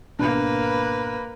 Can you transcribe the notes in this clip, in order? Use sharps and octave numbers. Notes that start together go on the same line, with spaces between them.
G#1 B2 A#3 D4 B4